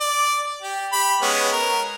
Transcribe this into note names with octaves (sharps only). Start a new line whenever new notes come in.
D5
G4
G4 B5
G#3 B3 C#4
A#4